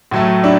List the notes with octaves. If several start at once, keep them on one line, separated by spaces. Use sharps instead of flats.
A2 F#3 A3
D4 E4